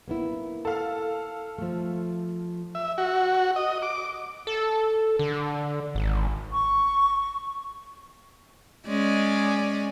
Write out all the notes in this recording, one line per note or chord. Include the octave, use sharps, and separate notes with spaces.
A#3 B3 E4
A4 F5
F3 A3
E5
F#4
D#5
D6
A4
D3
G#1
C#6
G#3 C#4 D5